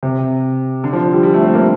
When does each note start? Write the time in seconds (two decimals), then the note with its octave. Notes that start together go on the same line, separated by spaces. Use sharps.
0.03 C3
0.84 D3
0.93 F3
1.13 G3
1.23 G3
1.34 A3
1.43 C4
1.54 A#3